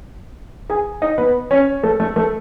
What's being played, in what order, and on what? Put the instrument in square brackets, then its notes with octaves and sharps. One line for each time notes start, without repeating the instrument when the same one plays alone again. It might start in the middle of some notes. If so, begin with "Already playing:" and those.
[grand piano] G#4 G#5
D#4 D#5
B3 B4
C#4 C#5
A3 A4
A3 A4
A3 A4